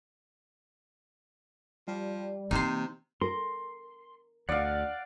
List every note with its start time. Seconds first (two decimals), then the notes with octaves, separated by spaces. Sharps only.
1.88 F3 G3
2.51 C3 E3 A#3 D#4 C5
3.21 A#4 C6
4.49 D2 D5 F5 F#5